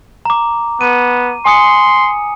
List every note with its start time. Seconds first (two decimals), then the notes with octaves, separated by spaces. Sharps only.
0.25 A#5 D6
0.81 B3 D#7
1.45 G#5 C6 D#6 C#7